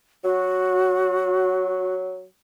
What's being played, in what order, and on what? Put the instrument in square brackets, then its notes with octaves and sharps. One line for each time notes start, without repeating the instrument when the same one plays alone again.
[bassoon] F#3 [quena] F#4